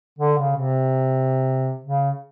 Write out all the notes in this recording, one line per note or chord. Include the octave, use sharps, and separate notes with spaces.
D3
C#3
C3
C#3